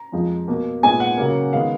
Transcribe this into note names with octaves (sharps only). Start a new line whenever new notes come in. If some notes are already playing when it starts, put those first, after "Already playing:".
Already playing: A#5
F2 F3 G#3
B2 A#3
A#2 G#3 B3 G#5
F#5
C#3 F#3 A#3
D#3 G#3 B3 F5